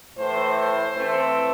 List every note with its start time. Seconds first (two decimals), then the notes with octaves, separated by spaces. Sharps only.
0.17 A2 E3 A3 C5
0.56 C5
0.93 E3 A3 C4